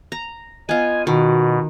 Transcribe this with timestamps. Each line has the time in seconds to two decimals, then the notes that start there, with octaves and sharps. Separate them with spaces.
0.12 A#5
0.69 B3 F4 D#5 G#5
1.07 B2 D#3 F#4